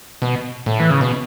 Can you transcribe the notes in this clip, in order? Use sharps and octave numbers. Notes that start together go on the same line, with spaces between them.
B2
A2
E3
C#3
B2